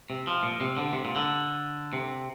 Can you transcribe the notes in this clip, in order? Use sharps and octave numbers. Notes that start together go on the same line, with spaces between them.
C3
F3
A#2
C3
D3
C3
A#2
D3
C3